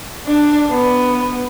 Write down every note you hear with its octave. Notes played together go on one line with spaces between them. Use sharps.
D4
B3